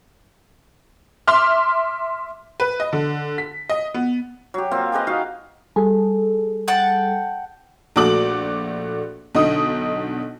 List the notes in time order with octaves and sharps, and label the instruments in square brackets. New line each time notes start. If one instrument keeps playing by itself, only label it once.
[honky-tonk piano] E5 C6 D6 F6
B4
D#5
D3
B6
D#5
B3
[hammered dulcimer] F#3 G4
A#3 C4 F4
G4 G#4 B4 D#5
D#4 F#4 F5
[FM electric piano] G3 G#4 A4
[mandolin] F#5 G5 A5
[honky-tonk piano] A#1 A3 F#4 D6 F#7
B1 D3 D#4 D#5 D#6